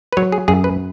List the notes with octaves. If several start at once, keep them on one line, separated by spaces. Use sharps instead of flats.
B4
F#3 C#5
G#4
F#2 G#4
B4